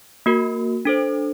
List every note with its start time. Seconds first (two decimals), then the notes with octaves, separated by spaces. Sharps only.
0.26 A#3 F#4 A#4
0.85 D4 A4 C5